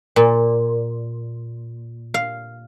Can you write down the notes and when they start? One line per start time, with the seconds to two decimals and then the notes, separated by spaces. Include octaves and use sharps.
0.16 A#2
2.14 F5